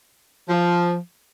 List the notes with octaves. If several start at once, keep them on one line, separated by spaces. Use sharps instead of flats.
F3